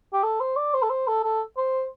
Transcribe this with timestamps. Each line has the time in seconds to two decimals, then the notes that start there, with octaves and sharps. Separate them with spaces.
0.13 G4
0.23 A4
0.40 C5
0.56 D5
0.74 C5
0.83 A4
0.90 C5
1.08 A4
1.24 A4
1.57 C5